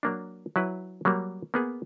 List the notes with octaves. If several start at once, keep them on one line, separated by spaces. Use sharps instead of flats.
F#3 A#3 D4
F#3 E4 B4
F#3 G3 A#3
A#3 B3 G#4